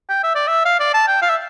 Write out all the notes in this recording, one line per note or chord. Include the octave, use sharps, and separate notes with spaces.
G5
E5
D5
E5
F5
D5
A5
G5
F5
E5